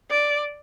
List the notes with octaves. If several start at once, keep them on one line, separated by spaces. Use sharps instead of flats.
D5